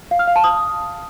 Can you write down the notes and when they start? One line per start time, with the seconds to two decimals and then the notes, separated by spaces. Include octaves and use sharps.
0.11 F5
0.19 F6
0.28 F5
0.36 A5
0.44 D#6